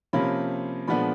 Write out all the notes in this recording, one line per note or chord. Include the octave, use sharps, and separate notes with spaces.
C3 F3 A#3 C#4 B5
A#2 F3 G#3 B3 D4 B5